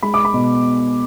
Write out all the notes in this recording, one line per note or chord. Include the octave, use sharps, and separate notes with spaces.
G#3 B5
D6
B5
B2